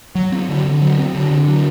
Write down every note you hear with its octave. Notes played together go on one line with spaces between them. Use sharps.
F#3
C4
D3
D3
F#3
C4
D3
D3
F#3